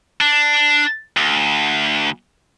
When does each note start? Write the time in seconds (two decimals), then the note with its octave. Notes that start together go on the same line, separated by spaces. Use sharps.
0.21 D4
1.17 D2